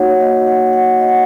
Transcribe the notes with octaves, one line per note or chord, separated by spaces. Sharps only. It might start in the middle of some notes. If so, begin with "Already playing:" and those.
Already playing: A#3 D#4 F#4 C#5 F#5
D#5
F#5
F#5
D#5
F#5